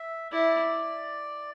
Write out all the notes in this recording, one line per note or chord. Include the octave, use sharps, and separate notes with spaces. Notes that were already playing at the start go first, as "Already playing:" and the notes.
Already playing: E5
E4 D5